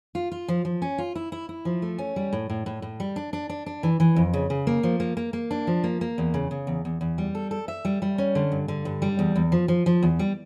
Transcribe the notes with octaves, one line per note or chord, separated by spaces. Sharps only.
F4
F4
F3
F3
C#4
F4
E4
E4
E4
F3
A3
C#4
G3
A2
A2
A2
A2
G3
D4
D4
D4
D4
E3
E3
F2
C#3
C#3
A#3
F3
A#3
A#3
A#3
D4
F3
A#3
A#3
E2
C#3
C#3
E2
E2
E2
G3
A4
A4
E5
G3
G3
C#4
D3
G2
D3
G2
G3
E2
E2
F3
F3
F3
E2
G3